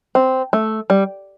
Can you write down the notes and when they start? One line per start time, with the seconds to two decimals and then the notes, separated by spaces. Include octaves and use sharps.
0.15 C4
0.53 A3
0.90 G3